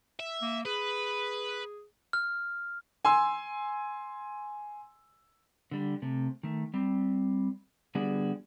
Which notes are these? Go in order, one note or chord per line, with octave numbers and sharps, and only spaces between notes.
E5
A#3
G#4 B4
F6
G#5 C6 E6
D3 G3
C3 A3
D#3 A3
G3 C4
D3 G3 B3 F#4 G#4 D5